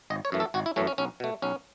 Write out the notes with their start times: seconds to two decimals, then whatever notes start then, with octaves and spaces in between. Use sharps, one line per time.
0.10 G#1 D#5
0.25 C#5
0.32 F#2 E3 A3
0.40 A4
0.54 G#1 F#4
0.66 E4
0.76 F#2 E3 A3 C#4
0.87 C#4
0.98 B1 C#4
1.20 B2 A3
1.42 B1 C#4